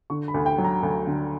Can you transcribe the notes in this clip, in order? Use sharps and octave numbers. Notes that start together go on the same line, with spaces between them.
D3 C#6
B5
D2
G5
F#3
A#5
D2
D3